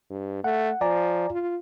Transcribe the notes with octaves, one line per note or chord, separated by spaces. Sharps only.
G2
A3 F#5
F3 D5 G#5 A#5
F4